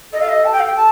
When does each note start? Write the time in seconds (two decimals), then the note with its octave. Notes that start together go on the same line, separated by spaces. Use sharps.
0.13 A4 D#5
0.21 F5
0.29 D#5
0.45 A5
0.52 G5
0.60 F5
0.66 G5
0.76 A5